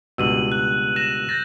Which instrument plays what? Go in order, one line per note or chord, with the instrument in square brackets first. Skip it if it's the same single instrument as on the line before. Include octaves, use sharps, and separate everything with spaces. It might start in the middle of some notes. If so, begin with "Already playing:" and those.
[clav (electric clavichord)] C#2 G2 B2 [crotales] E6 D#7 F#7
[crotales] F#6
F#6 A#6 E7
G6 A6 A#6